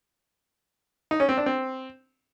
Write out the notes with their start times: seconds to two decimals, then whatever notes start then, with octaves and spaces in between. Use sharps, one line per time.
1.11 D#4
1.20 C#4
1.29 C4
1.38 D4
1.46 C4